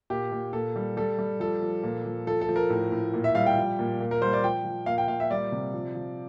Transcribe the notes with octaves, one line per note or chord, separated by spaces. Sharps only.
A#2 G4
A#2
A#2 A4
G3
G3 A4
G3
F3 A4
F3
A#2
F3
F3 A4
A4
F3
A#4
A2
A2
A#2
E5
G3 F5
G5
F3
A#2
A#2
A#4
G3 C5
D5
F3 G5
F3
A#2 F5
G5
A#2 F5
E5
G3 D5
C3
F3
F3